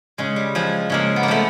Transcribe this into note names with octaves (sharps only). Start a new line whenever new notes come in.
C#3 G#3
G3
F3 G#3
C#3 G#3 A#3
B3
A#3
F3 A3 B3